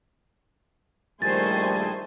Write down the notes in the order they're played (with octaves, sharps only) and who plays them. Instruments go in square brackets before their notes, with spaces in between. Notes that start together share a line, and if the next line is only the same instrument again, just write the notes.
[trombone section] A#1 G3 A3 [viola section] D#3 C5 G#5 [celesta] A6